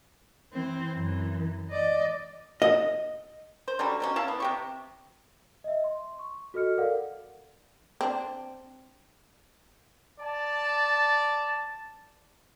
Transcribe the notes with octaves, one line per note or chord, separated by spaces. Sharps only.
E3 C4
F#2 E3
D5 D#5
D#5
C5
D3 F#3 G3 C#4
B2 F#3 C#4
C#4 E4 F5 A5
B3
C3 G4 C#6
D#5 E5
C6
C#6
F#4 A4 D#5 F6 C#7
A4 A#4 D5 F5 F#5
C4 D4
D5 A5